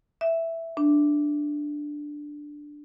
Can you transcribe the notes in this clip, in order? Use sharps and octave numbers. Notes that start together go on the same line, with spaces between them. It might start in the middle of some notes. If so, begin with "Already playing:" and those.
E5
D4